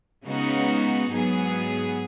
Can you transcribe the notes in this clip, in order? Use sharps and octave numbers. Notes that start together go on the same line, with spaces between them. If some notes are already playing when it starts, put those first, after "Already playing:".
C#3 G#3 B3 D#4 F#4
G#2 F#3 B3 G#4